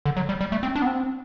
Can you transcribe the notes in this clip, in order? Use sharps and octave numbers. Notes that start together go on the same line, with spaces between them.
D3
F#3
G3
G3
A3
C4
D4
B3
C4